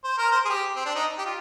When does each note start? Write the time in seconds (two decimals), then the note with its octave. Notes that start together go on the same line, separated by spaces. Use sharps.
0.04 C5
0.18 A#4
0.32 C5
0.46 G#4
0.50 G4
0.76 C4
0.86 D4
0.96 D#4
1.19 G4
1.26 F4